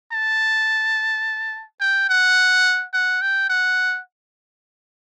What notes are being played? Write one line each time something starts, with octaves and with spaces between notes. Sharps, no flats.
A5
G5
F#5
F#5
G5
F#5